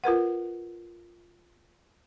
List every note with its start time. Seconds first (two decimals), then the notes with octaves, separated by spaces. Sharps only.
0.04 F4 A#4 B4 F#5